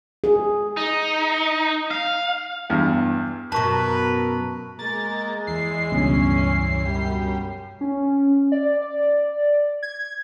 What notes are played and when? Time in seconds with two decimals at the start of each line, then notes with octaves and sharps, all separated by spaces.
0.24 G#4
0.77 D#4
1.91 F5
2.70 E2 G2
3.52 F#2 B2 A#4 B4 A5 C#6
4.79 G#3 A#3 A6
5.47 E2 C7
5.92 C#2 G2 B2 C#4
6.85 F#2 G3
7.81 C#4
8.52 D5
8.82 D5
9.83 G#6